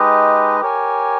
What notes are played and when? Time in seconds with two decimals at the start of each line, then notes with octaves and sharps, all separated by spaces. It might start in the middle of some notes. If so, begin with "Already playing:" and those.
Already playing: G#3 D#4 G4 B4 D#5
0.60 G4 A#4 C#5 G#5